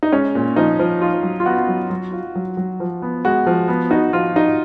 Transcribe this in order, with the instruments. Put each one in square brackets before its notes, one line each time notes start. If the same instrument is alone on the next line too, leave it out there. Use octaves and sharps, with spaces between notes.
[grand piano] D#4
[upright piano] G#3 [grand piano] C#4
[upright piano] A#2
[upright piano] F3 [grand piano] D#4
[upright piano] F3
[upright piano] D#4 [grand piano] F4
[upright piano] F#3
[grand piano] F4
[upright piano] B3 [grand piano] F#4
[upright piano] F#3
F#3
F4
F#3
F#3
F3
B3
[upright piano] G#3 [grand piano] F#4
[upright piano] F3
B3
[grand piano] D#4 [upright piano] F#4
[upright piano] F3 [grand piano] F4
[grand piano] D#4 [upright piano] F#4